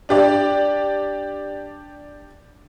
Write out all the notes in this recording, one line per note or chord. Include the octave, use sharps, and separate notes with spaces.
D4 G4 D5